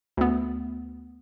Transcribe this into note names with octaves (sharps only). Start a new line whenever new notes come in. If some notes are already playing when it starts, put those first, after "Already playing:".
D2 B3